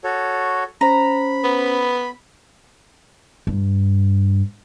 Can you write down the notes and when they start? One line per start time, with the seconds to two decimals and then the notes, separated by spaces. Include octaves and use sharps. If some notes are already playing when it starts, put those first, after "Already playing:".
0.04 F#4 A4 C#5
0.81 C#4 C5 A#5 B5
1.44 B3
3.47 G2